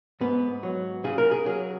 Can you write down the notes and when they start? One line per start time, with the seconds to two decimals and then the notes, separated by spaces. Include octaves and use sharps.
0.21 G#2 B3
0.63 F#3
1.04 C#3 G#4
1.18 A#4
1.31 G#4
1.45 F#3 G#4